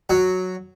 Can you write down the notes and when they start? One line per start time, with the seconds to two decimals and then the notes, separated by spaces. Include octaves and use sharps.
0.10 F#3